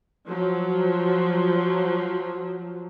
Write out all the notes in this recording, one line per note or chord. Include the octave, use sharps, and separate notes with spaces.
F3 F#3